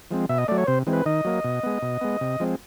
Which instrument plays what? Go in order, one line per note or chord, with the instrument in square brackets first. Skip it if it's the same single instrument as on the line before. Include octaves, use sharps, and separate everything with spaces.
[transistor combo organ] F3 G#3 C4
B2 E5
D#5
F#3 A3 D5
C#5
C3 C5
E3 G#3 C4
B4
D#3 D#5
F#3 A#3
B2
G#3 B3
B2
G#3 B3
C3
F3 G#3 C4